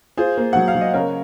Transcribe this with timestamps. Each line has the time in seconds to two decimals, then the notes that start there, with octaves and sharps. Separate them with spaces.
0.17 F4 G#4 C5
0.37 A#3
0.53 F#3 F#5
0.68 F5
0.75 F#3
0.81 D#5
0.94 C#3 A#4 C#5